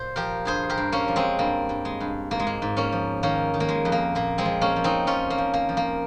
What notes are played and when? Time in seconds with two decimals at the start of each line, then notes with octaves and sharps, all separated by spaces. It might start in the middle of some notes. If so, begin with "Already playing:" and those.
Already playing: A#2 C5
0.16 F3 G4 A#4
0.45 G2 G#4 C5
0.70 G4 A#4
0.77 G2
0.92 A#3 C#4
1.08 F3
1.16 G#3 C4
1.39 G2 A#3
1.69 G2
1.85 G#3
2.00 G2
2.31 G#2 A#3
2.40 G#3
2.47 A#3
2.62 G#2
2.77 A#3 C#4
2.92 F3
3.23 D#3 A#3 C#4
3.54 D#3
3.60 A#3
3.69 G#3
3.85 F2
3.92 A#3
4.15 A#2 A#3
4.38 G#3 C4
4.45 F3
4.61 A#3 C#4
4.76 F3
4.84 C4 D#4
5.07 F3 C#4 F4
5.30 A#3
5.38 F3
5.54 A#3
5.69 F3
5.77 A#3